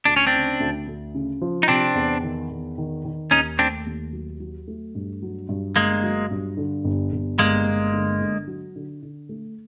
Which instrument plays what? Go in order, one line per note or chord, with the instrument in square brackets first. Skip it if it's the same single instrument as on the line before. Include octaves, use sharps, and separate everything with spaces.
[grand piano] D2 [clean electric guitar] D4
[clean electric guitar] C#4
C4 D4
[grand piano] C#3
D2
D2
C#3
F3
[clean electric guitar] D#4
[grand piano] C3 [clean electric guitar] C4 D4
[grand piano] E2
D#3
E2
D#3
D#3
[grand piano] D#2 [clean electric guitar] C#4 D#4
[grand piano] A3 [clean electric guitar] C4 D4
[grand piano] D#2
F#3
F#3
A3
G2
F#3
G2
[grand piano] G1 [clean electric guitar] G#3 A#3
[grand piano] F#3
G2
D3
G1
G1
[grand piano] G1 [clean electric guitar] G#3 A#3
[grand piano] G1
D3
D3
F#3
D3
D3
A3